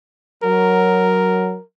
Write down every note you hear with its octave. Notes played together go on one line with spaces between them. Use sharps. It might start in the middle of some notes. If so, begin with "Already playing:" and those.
F#3 A#4